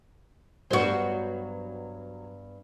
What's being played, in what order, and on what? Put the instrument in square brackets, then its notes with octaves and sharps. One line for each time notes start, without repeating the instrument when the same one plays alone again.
[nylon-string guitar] G2 B3 C5 [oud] F#3 F#4